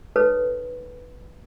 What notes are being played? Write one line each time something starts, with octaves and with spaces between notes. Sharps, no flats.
D#4 G#4 A4 B4 C#5